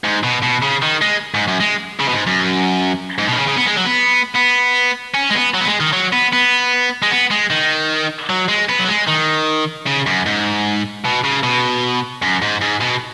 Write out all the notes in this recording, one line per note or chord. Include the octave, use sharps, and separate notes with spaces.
G#2
B2
B2
C#3
D#3
G#3
G#2
F#2
G#3
C#3
B2
G#2
F#2
G#2
B2
D#3
C#3
C#3
B3
G#3
F#3
B3
B3
C#4
G#3
B3
F#3
B3
G#3
D#3
F#3
B3
B3
G#3
B3
G#3
D#3
F#3
G#3
B3
F#3
G#3
D#3
C#3
F#2
G#2
B2
C#3
B2
F#2
G#2
G#2
B2